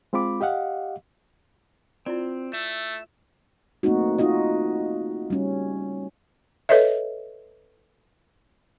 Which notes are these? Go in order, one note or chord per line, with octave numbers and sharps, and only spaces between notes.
G#3 C4 F4 B5 D6
G4 D#5 F5 F#5
C4 E4 F4 D5
A3 E5
A3 A#3 C4 D#4 F#4
D#4 F4 F#4 D#5
G3 C#4
A4 B4 C#5 D#5 E5